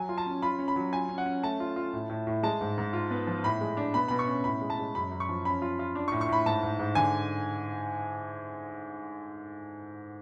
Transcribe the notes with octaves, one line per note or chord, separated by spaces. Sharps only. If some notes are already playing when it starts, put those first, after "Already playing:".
Already playing: F#3 G#5
F4
A5
C#4
F4 B5
C#4
B5
F#3
F4 G#5
C#4
F#5
C#4
A3 A5
F4
F4
A2
A2
A2
G#3 A5
G#2
G#2
F4
B3
F3
A2 B5
G#3
D4
B2 B5
B2 B5
C#6
C#4
A2 B5
G#3
A5
G#3
F#2 B5
F#2
C#6
F3
C#4 B5
F4
F4
D4
C#6
A2
C#6
A2 B5
G#2 A5
G#2
G#2
D3 G#5